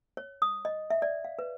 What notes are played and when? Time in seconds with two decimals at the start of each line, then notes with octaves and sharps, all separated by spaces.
0.17 C#5
0.42 D#6
0.65 D#5
0.90 E5
1.02 D5
1.25 F5
1.39 B4